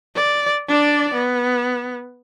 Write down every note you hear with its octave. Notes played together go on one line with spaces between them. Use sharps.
D5
D4 D5
B3